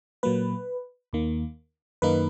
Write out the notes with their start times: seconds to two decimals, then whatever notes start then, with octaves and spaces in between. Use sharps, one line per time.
0.23 A#2 F#3 A#3 B4
1.13 D#2 D#3 A#3
2.02 F#2 D#3 A#3 D#4 B4